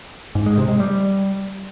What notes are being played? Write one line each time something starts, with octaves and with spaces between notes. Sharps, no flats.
G#2
G#3
C3
G#3
G3